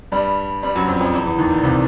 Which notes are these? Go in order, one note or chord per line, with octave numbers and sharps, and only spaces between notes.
G2 G3
G2 G3
F#2 F#3
F2 F3
F2 F3
E2 E3
E2 E3
D#2 D#3
A#2
C2 C3